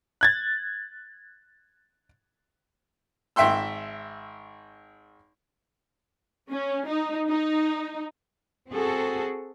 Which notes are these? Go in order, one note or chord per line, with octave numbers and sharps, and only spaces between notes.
F#6 G#6 A6
G#1 E5 G5 C6 E6
C#4
D#4
D#4
C4 F#4 G#4 A4